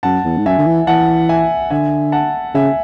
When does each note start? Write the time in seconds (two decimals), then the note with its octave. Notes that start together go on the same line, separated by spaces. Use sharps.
0.03 F#2 F#5 A5
0.24 E2
0.38 G#2
0.46 F#2 E5 G#5
0.58 D3
0.67 E3
0.87 E3 F#5 A5
1.29 E5 G#5
1.70 D3 E5 G#5
2.12 F#5 A5
2.54 C#3 E5 G#5